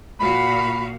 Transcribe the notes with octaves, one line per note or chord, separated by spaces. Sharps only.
A#2 F#4 F5 B5